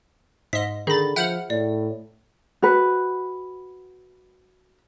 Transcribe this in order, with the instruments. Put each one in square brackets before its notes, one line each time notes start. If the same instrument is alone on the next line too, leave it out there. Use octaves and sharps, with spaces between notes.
[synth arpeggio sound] G#2 D#5 [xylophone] B6
[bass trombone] D3 [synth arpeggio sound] D#3 A6 [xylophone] G#4 B5
[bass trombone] F3 [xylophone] E5 G6 F#7 [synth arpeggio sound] F#5 F6
[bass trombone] A2 [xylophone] D5
[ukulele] F#4 B4